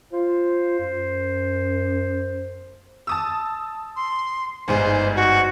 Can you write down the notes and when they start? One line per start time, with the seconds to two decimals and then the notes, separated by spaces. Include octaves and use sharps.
0.13 F4 C5
0.80 F#2
3.07 A5 D#6 E6
3.96 C6
4.68 G1 G#2 C5 G#5
5.16 F#4